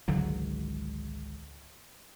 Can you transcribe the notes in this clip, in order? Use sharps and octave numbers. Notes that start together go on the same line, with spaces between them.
G#1 C#2 D3 F#3